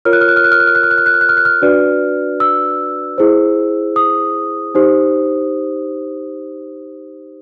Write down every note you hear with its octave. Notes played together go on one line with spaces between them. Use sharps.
F4 A#4 C#5 F6
F#6
F6
F#6
F6
F#6
F6
F#6
F6
F#6
F6
F#6
F6
F#6
F6
F#6
F6
F#6
F6
D4 F#4 B4 D5
E6
E4 G#4 C5
D#6
D#4 G4 C5